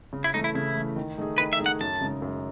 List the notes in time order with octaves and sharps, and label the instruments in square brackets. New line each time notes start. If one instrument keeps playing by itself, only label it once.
[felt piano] C#3
[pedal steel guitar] E4
[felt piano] E3 A3 [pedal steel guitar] D#4
[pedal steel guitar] E4
[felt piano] C#3 [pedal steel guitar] E4
[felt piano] E3 A3
D#3
A3 D#4 G#4
[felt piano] D#3 [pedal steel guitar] B4
[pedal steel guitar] E5
[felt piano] A3 D#4 G#4
[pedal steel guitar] F#5
[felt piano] F#2 [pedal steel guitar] A5
[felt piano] C#3 G#3 D#4
F#2